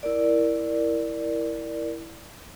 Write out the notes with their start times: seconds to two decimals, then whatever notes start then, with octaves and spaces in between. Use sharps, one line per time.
0.03 E4 A#4 D5